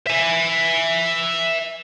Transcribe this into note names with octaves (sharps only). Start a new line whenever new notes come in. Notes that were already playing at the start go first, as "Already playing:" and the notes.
E5 G#5